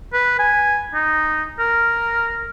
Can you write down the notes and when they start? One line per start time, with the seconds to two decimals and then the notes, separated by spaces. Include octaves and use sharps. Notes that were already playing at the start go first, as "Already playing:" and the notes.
0.14 B4
0.39 G#5
0.94 D#4
1.59 A#4